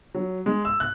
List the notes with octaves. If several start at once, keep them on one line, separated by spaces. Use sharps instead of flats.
F#3
G#3
E6
F#6